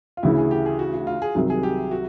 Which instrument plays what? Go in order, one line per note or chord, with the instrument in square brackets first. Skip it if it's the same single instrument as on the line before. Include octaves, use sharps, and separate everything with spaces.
[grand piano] F4
[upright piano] D2 C#3 E3 [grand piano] E4
[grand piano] G#4
G4
G#4
F#4
F#4
F4
G#4
[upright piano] C2 C3 D#3 F#3
[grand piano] G#4
G4
F#4